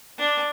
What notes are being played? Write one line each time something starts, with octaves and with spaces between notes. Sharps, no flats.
D4